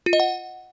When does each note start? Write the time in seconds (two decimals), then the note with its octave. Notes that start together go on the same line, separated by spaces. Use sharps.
0.06 F4
0.13 D#5
0.20 F#5